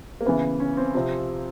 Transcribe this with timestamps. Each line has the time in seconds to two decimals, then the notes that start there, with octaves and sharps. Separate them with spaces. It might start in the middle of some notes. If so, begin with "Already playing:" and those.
0.21 A#3
0.26 C#3 E3 B3
0.60 C#4
0.77 C4
0.95 C3 F3